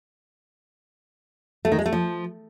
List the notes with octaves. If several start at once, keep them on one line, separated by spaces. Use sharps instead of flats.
A3
D#3
G#3
A3
F3